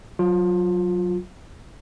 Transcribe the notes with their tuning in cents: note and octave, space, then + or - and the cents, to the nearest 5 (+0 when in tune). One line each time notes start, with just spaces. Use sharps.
F#3 -5 F4 +20